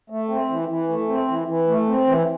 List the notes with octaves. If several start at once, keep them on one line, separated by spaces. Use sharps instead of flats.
A3
C4
E3
E3
A3
C4
E3
E3
A3
C4
E3